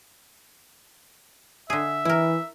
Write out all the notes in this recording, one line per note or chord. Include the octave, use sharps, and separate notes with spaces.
D3 G#4 E5
E3 E4 A#4